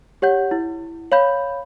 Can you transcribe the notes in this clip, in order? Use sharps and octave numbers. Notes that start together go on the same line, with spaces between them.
G4 C#5 F#5 G6
E4
C#5 F5 B5 G6